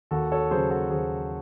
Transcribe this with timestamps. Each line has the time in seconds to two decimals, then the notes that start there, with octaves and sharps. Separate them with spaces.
0.11 D#2 F#4 A4
0.32 A4 C#5
0.51 C#3 F#3 G#4 C5
0.70 F#4 A4
0.90 D#2 G#4 C5